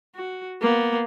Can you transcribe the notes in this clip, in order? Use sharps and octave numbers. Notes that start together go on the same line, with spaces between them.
F#4
A#3 B3